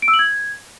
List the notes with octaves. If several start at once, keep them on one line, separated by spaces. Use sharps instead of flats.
D7
E6
F#7
G#6